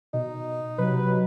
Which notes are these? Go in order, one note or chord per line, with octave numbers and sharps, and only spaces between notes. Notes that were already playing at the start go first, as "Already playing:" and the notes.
B2 D#4
C3 F#3 B4